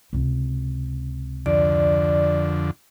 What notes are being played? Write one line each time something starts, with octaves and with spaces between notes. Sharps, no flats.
C#2 C3
F2 D3 D5